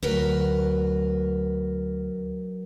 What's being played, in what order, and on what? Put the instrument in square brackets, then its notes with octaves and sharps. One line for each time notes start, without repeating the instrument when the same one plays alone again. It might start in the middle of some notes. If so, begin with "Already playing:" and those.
[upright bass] D2 [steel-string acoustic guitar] F#3 A#4 B4